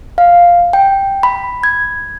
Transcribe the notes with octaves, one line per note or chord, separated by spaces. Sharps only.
F5
G5
B5
G#6